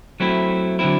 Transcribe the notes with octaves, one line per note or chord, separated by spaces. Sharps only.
F#3 A3 C4 E4
D3 F#3 C4 E4